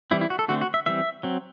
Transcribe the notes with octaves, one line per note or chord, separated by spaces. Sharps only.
E3 G3 C4 E4
E4
F#4
A4
D3 A3 C4 F#4
F#4
E5
E3 G3 C4 E5
F#3 C4